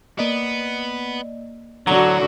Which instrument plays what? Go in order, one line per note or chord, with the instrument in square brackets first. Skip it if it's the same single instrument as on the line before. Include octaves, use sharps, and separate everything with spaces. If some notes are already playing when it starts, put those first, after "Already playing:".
[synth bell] A#3 D5 D#5 [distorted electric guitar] B3
[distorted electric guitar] A2 [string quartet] D3 F#4 [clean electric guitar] F#3 [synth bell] A#5